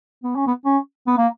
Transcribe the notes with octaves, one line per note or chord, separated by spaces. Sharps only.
B3
C#4
B3
C#4
B3
A#3